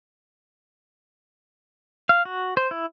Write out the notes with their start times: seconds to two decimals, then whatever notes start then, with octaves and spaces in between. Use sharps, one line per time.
2.09 F5
2.25 F#4
2.57 C5
2.71 E4